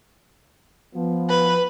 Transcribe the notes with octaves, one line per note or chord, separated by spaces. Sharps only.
F3 B3
B4